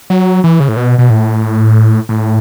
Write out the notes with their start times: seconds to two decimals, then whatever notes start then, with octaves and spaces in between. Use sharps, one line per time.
0.10 F#3
0.44 E3
0.60 C#3
0.69 A2
0.77 B2
0.98 B2
1.10 A2
2.09 A2